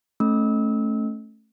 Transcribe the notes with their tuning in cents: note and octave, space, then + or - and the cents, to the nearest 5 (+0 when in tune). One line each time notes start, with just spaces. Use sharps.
A3 +0 C#4 -10 E6 -30